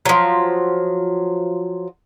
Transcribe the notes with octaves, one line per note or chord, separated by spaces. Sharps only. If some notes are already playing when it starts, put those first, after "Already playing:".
F3 F#3